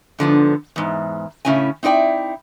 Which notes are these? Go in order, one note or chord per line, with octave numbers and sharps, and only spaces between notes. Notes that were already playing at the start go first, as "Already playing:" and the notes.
G#2 D3 F3 B3
E2 G#2
A2 C#3 C#4 E4 G#5
C4 D#4 E4 D5 G5